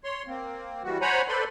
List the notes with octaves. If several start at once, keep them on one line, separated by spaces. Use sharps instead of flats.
C#5 C6
A#3 C4
E3 G3 F#4
C5 C#5 F#5 G#5 A#5 B5
A4 B4 C5 D5 B5 C6